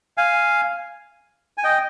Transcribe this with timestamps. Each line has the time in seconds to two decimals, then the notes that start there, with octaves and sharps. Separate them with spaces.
0.17 F5 G#5
1.58 G#5
1.63 D#5 G5